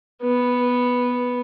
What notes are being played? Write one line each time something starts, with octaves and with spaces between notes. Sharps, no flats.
B3